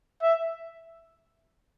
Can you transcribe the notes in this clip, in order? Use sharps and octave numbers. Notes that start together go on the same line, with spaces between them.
E5